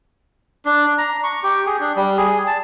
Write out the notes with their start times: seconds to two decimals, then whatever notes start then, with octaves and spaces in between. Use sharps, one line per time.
0.65 D4
0.98 A#5
1.24 C#6
1.44 G4
1.66 G#4
1.80 D4
1.96 G3
2.18 G#4
2.47 A5